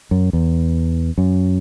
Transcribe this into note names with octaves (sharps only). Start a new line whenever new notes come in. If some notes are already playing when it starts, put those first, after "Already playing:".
F#2
E2
F#2